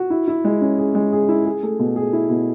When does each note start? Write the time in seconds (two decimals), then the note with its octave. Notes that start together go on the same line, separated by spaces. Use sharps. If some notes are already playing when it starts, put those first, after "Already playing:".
Already playing: F#4
0.10 E4
0.28 E4
0.44 G#3
0.61 C#4
0.78 G#4
0.95 G#3
1.12 G#4
1.29 E4
1.46 G#4
1.63 A3
1.79 B2
1.96 G#4
2.13 E4
2.30 B2